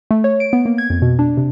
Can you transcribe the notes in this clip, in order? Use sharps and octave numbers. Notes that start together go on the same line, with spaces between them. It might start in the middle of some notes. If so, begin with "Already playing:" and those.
A3
C#5
D7
B3
A#3
G#6
F2
B2
D4
C3